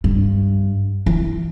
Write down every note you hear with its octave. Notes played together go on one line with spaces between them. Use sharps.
G2
E3